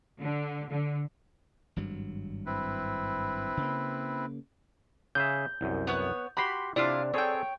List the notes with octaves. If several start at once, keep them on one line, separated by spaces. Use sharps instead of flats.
D3
D3
G#1 G2 F#3
C4 E4 B4
C#3 A#3
C#3 G#4 E5 G6
C2 F#2
B3 C#5 F#6
F#4 G4 B5 C6
C3 D4 E4 F4 D5 F5
C4 G#4 A4 C#5 G5